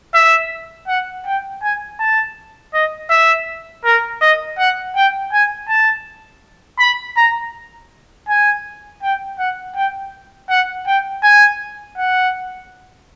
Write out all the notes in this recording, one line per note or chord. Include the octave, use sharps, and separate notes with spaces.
E5
F#5
G5
G#5
A5
D#5
E5
A#4
D#5
F#5
G5
G#5
A5
B5
A#5
G#5
G5
F#5
G5
F#5
G5
G#5
F#5